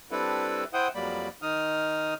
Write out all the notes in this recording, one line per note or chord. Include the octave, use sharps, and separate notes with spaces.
G3 C4 D4 E4 A4 B4
E4 C5 F#5 G5 D#6
F2 F#3 G3 A#3 D5 B5
D#3 D#4 D#6 F6